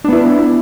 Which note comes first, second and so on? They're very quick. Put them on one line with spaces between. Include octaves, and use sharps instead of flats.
D4 B3 E4